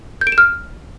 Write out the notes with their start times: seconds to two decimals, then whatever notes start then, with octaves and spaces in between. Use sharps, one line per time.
0.21 G6
0.27 D7
0.32 E7
0.38 F6